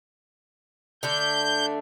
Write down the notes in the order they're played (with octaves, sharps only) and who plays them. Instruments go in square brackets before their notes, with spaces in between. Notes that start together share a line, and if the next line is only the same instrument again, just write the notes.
[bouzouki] D3 A3 D4 [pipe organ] G6